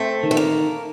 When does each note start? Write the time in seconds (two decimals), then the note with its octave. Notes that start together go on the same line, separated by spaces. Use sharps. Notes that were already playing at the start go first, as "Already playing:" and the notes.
Already playing: A3 C4
0.23 D#3
0.31 A3
0.37 A#3